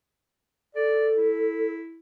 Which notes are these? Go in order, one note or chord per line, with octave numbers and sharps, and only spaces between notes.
A4 D5
E4